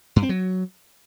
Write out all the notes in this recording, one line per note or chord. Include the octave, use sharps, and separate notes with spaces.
G2
C4
F#3